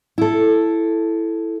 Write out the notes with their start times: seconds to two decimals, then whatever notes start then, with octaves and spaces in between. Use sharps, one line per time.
0.18 E4 A4